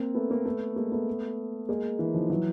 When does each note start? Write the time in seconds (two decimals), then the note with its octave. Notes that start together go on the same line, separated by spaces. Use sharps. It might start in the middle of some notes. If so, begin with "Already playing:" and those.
Already playing: A#3 C4
0.15 A3 B3
0.30 A#3 C4
0.45 A3 B3
0.76 G#3 A#3
0.92 A3 B3
1.69 G#3 A#3
1.99 E3
2.14 D#3 F3
2.30 E3 F#3